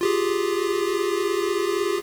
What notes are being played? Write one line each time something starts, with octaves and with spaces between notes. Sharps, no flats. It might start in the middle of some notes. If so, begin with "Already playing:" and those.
F4 G4 G#4